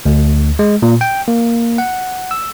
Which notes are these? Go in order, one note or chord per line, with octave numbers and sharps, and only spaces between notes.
D2
G#3
A#2
G5
A#3
F#5
E6